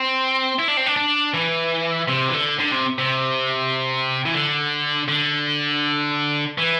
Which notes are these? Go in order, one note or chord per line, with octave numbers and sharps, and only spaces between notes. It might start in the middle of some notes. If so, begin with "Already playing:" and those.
Already playing: C4
E4
D4
C4
D4
D4
E3
C3
E3
D3
D3
C3
C3
E3
D3
D3
E3